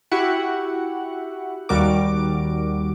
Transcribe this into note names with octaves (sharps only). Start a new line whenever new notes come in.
E4 F#4 G4 F#5
D#2 G3 F#4 A#4 D6